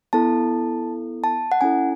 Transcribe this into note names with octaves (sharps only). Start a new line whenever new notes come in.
B3 E4 A4 A5
A5
F#5
C#4 E4 A4 G#5